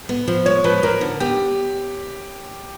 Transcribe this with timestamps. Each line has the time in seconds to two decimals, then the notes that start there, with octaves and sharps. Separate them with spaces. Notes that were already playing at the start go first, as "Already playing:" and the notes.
0.09 B3
0.28 F3
0.46 G#3 C#5
0.64 F3 B4
0.83 F3 A#4
1.01 D3
1.20 B3 G4